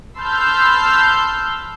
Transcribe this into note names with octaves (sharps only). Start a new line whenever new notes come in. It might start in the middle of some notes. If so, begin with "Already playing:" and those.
A5 B5 C6 E6 F6 G6